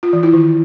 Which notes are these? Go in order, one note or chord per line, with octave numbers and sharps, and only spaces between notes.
F4
E3
E4
D#3